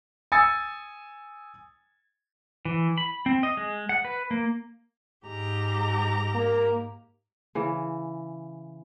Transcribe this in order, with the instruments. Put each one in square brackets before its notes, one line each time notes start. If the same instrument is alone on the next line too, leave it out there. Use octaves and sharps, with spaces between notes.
[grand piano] G#5 D#6 E6 G#6 A6 C#7
[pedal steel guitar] E3
B5
C4
D#5
G#3
F#5
B4
A#3
[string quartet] G#2 G4 A#5
[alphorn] A#3
[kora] C#3 E3